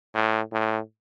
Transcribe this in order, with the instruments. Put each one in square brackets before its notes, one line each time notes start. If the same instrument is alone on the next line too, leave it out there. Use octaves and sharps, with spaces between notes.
[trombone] A2
A2